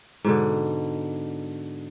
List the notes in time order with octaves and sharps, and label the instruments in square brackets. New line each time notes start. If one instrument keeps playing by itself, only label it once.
[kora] G#2 B2 D3